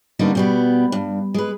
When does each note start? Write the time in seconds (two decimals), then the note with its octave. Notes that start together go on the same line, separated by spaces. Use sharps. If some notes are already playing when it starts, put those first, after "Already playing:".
0.19 D3 G3 A#3 B3 C#4 D#4
0.35 B2 G3 B3
0.92 G2
1.34 G#3 B4